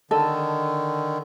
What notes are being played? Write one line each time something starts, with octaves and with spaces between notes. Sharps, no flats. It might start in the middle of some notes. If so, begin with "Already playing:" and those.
D3 D#3 A4 D#5